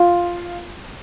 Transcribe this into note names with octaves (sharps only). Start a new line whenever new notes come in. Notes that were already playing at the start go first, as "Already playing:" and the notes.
Already playing: F4